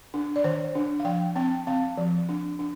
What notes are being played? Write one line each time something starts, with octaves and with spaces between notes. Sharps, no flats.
D4
D5
D#3 C5
D4
F5
F3 G5
C4 G5
C4 F5
F3
D4
D4